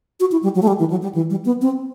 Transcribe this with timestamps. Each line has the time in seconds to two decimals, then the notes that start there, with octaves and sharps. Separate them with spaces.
0.20 F#4
0.32 E4
0.43 G3
0.55 F#3
0.62 A3
0.68 G3
0.79 E3
0.90 F#3
1.02 G3
1.15 E3
1.30 G3
1.45 B3
1.62 C4